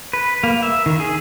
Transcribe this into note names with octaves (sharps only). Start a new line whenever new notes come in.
B4
A#3
E5
D#3
G#4